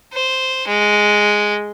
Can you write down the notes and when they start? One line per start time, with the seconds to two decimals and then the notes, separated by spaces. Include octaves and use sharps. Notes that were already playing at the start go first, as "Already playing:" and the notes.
0.13 C5
0.67 G#3